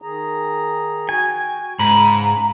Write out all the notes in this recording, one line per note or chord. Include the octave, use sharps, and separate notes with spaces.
D#3 G#4 A#5
F#4 G5 G#5
G#2 C#3 A#5 B5